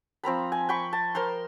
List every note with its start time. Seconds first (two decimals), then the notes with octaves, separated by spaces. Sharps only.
0.23 F3 C4 A#5 B5
0.52 G#5
0.69 G5 B5 C#6
0.93 A5
1.15 A#4 C5 A#5 C6